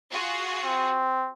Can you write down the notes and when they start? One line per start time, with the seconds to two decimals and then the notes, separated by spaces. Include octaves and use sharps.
0.10 F4 F#4 G#4
0.65 C4